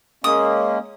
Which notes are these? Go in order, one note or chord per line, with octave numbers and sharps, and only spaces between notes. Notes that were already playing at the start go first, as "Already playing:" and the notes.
G#3 A#3 C#4 D#6